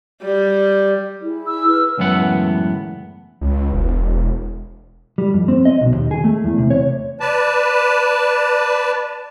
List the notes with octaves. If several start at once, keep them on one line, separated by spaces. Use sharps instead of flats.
G3
E4 G#4
E6
B4 F6
C#2 F#2 A2 E3 B3 F#5
C#2
E1
G3
F2
C4
D#5
B1
D#2
G#4
A3
E2
C3
C#5
B4 D5 A5